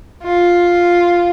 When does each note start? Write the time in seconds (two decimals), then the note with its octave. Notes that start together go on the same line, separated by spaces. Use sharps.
0.23 F4